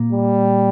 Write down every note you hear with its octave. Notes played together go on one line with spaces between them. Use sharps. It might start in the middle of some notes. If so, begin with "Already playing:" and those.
Already playing: A#2 A#3
G3